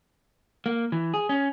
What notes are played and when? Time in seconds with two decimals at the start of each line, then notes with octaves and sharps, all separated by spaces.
0.66 A#3
0.92 E3
1.14 G#4
1.29 C#4